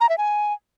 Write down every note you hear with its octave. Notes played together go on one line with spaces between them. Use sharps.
A#5
E5
G#5